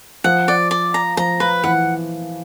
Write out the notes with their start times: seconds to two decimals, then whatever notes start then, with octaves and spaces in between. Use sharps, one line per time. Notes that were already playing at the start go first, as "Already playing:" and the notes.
0.24 F3 F#5
0.48 D5
0.71 D5
0.94 A#5
1.17 F3 A#5
1.40 F3 B4
1.64 E3 F#5